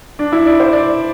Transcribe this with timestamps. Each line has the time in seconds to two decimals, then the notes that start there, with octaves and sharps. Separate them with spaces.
0.19 D4
0.32 E4
0.46 D5
0.60 C5
0.73 D5